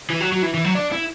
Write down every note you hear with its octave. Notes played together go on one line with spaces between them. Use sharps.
E3
F#3
F#3
E3
E3
F#3
D4
E4